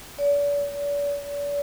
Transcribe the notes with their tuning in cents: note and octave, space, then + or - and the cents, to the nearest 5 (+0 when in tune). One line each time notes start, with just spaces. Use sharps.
D5 -45